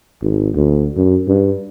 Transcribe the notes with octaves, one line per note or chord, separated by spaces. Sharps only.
G#1
D2
F#2
G2